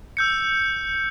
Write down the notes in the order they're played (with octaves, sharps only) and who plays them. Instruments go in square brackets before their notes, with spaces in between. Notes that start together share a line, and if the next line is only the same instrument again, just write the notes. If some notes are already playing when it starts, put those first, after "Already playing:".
[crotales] E6 G6 C#7